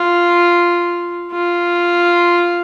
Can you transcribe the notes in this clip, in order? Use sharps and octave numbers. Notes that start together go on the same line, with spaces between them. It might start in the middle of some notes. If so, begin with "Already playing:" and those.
Already playing: F4
F4